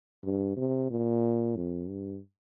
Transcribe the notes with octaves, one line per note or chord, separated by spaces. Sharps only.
G2
C3
A#2
F2
G2